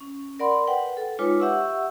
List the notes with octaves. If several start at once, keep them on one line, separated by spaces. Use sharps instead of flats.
C#4
A#4 D5 F#5 B5 C6
B4 F#5 G5
A4
G#3 D#4 F4 B4 C#5 D6
G4 E5 F#5 C#6 E6